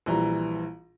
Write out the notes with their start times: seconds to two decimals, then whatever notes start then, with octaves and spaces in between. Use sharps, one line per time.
0.06 A#1 E3 G3 A#5